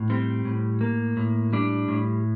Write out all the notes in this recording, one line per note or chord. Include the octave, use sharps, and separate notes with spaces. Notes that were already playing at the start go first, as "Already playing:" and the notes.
Already playing: A2
G3 C4
A2
A#3
A2
G3 D4
A2